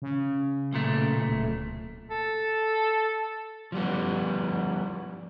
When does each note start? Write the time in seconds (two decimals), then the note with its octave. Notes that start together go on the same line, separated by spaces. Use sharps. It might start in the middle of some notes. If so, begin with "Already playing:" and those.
0.02 C#3
0.72 B1 A#2 A3
1.27 D1
2.10 A4
3.72 F3 G3 B3